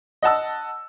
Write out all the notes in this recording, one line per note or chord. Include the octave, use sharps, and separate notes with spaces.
D#5 F#5 A5 E6